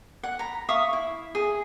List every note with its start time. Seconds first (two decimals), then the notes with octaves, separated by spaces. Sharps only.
0.23 F#5
0.39 A#5 B5
0.69 E5 F5 C#6 D#6
0.93 E4
1.35 G#4